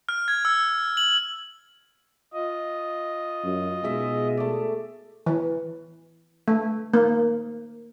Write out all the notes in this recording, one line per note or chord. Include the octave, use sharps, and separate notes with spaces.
F6
G#6
E6
F#7
F4 D#5
F#2
B2 G#3 D#4 E5
A3 D5
E3
A3
A#3